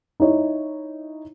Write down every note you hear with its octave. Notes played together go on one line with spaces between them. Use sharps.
D#4 E4 C#5